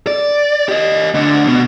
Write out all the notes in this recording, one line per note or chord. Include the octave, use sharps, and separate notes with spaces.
D5
G4 D#5
D2 D3
B2